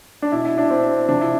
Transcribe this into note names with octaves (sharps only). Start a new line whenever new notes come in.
D4
B2 E4
E4
D4
C4
C3 F3 D4
E4